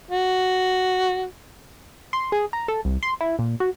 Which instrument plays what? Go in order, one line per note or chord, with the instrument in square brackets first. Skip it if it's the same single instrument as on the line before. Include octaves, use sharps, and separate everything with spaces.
[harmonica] F#4
[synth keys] C6
G#4
A#5
A4
C2
C6
E4
A#2
F#4